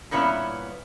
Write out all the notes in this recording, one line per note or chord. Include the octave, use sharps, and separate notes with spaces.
G2 A#2 B3 C#4 E4